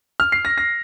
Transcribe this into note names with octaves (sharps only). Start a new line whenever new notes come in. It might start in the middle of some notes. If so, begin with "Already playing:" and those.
F6
C7
A#6
A#6